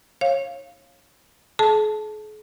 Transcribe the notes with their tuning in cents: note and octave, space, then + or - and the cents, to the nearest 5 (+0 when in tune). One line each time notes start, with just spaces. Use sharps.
C#5 -25 F5 +0
G#4 +45 A5 +0